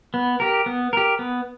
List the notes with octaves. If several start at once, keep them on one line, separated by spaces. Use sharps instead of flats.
B3
G4 A#4
B3
G4 A#4
B3